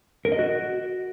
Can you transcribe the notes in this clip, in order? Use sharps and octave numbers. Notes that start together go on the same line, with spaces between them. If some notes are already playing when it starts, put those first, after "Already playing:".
A#4
D#5
F#4